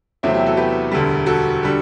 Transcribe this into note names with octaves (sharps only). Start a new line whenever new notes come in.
E2 C3 F#3 A3 C4 E4
E4 G4
F#4 A4
G4 B4
E1 D2 D3 G3
F#4 A4
D3 G3